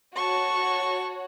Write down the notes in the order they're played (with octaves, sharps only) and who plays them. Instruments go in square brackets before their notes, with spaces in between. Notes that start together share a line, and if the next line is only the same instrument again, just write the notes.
[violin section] F#4 C#5 [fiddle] A5 C#6